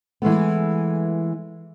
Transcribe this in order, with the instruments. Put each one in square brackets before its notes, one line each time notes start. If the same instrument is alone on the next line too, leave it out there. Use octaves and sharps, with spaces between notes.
[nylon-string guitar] E3 G#3 A3 B3